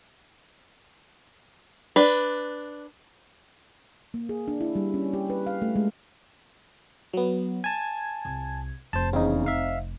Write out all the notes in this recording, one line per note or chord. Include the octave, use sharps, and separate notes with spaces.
D4 B4
A#3
G#4
D4
E4
G3
C#4
G4
B4
F5
A3
G#3
F#3 B3
G#5 A5 G#6
C2
F1 C5 A5
E2 C#3 C4 D#4
E5 F5